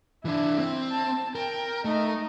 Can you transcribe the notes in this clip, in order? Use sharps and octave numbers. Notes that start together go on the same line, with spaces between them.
E3 D4 E4
C4
A5
A#4 G5
A3 D#4